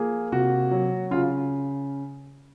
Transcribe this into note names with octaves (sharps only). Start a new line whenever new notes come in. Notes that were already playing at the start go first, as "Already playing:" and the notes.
Already playing: F3 A#3 G#4
C3 F#4
F#3
C#3 F4